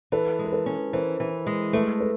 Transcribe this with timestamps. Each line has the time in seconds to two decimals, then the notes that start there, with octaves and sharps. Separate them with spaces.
0.12 E3 A4 B4
0.39 G#3
0.45 A#4
0.52 A4 B4
0.66 C#4
0.93 E3 A#4 C5
1.20 E3
1.47 G#3
1.73 A3 A4 B4
2.00 A4 B4